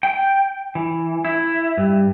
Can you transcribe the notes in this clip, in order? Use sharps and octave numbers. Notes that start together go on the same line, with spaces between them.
G5
E3
E4
G2